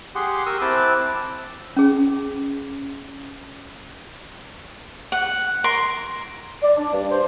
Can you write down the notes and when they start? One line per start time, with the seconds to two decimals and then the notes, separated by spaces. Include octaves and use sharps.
0.15 G4 G#4 F#5 C6
0.46 G4 A#4 C#6 D#6 E6
0.61 C4 E4 A5 D6 F#6
1.77 C#4 G#4
5.12 F#5
5.64 A#4 C6
6.62 D5
6.77 D4
6.93 G2
7.11 C5